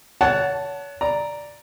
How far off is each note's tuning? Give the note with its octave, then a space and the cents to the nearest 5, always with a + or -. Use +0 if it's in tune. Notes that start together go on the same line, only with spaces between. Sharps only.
C#5 +35 F#5 +0 A5 +0
D5 +0 A#5 +0